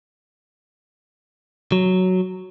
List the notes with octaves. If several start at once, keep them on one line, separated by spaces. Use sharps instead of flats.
F#3